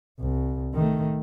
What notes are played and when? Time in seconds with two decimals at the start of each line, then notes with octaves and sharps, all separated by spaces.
0.19 C2
0.74 D#3 A3